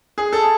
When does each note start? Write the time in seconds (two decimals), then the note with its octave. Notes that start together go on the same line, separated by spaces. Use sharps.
0.18 G#4
0.33 A4